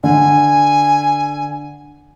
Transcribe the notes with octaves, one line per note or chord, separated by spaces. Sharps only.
D3 G#5